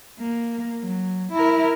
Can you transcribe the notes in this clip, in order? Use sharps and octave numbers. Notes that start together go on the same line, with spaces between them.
A#3
F#3
E4 A#4